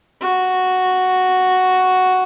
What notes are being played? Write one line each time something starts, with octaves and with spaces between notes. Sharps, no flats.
F#4